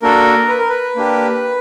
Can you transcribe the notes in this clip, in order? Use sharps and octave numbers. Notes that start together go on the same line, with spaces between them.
A#3 D4 F#4 A4 A#4
B4
A#4
B4
A#3 D4 G4